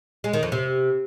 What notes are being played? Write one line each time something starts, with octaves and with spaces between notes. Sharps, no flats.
G#3
D#3
F2
C3